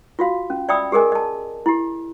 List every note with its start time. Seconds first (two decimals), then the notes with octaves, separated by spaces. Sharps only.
0.19 F4 F#4 F5
0.50 C#4
0.69 D5 E5 G5 B5 D#6 E6
0.92 G4 G#4 A#4 D#5 G#5
1.12 D#5 A5
1.66 E4 G4